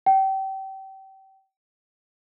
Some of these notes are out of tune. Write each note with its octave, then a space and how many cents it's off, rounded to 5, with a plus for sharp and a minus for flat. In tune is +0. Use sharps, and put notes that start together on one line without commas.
G5 -30